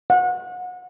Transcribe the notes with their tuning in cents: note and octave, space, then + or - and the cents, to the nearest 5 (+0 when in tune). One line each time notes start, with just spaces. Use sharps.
F#5 -30